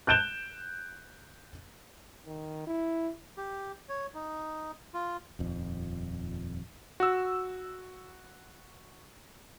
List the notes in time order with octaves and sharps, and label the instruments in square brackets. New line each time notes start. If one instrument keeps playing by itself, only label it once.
[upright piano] F#6 G6 D7 E7 G7
[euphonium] D#3
E4
[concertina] G4
C#5
D#4
F4
[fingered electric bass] D#1 F2
[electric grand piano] F#4 E6